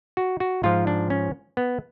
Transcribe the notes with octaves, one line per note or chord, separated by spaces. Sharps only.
F#4
F#4
G#2 F3 F4
D4
C#4
B3